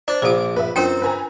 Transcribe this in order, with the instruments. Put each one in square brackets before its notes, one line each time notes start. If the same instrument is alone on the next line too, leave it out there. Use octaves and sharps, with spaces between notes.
[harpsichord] D4 [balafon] C5
[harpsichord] A#1 D6 [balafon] C5 F5
[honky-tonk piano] B4 E5
[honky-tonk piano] F#2 [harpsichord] C4 G5 [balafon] D4 F4 A#4
[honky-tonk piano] B4 G#5 A#5